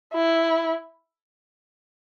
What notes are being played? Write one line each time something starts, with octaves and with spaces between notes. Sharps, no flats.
E4